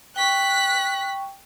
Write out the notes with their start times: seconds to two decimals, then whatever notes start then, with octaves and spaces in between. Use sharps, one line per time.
0.16 G5 C#6 F#6 B6